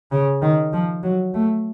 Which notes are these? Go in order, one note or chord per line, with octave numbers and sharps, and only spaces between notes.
C#3
D#3
F3
F#3
A3